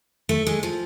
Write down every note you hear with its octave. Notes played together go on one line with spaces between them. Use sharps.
A3
G#3
F3